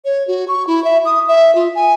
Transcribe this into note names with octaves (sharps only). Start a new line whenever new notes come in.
C#5
F#4
C#6
E4
E5
D#6
E5
F4
G#5